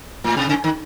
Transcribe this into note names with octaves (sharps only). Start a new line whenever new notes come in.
A2
C3
C#3
D#3